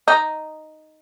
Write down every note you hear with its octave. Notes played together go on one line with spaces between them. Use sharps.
D#4